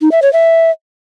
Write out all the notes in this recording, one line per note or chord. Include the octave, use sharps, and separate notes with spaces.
D#4
E5
C#5
E5